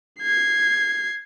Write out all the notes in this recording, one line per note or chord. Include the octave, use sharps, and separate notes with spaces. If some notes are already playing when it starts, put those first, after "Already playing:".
G#6 C7